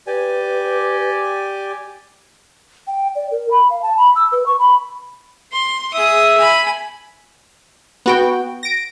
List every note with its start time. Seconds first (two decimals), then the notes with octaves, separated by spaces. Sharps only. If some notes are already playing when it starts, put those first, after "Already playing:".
0.07 G4 B4 D5 G#5
2.87 G5
3.16 D5
3.31 A#4
3.51 B5
3.70 F5
3.82 A5
3.98 B5
4.16 E6
4.32 B4
4.46 C#6
4.59 B5
5.53 C6
5.94 G#4 E5 D#6
6.38 G#5 B5
8.06 B3 F#4 G5
8.63 A#6 D7